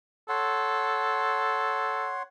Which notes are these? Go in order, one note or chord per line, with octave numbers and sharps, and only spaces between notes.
A4 C#5 F#5 C6